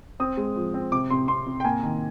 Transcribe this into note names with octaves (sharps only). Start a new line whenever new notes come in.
C4 D#6
G#3
F3
C4
C3 D6
C3 C6
C3 C6
C3
G5
A#3 G#5
D#3